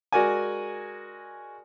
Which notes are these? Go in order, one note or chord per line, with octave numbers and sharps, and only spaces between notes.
G#3 F#4 A#4 D5 G#5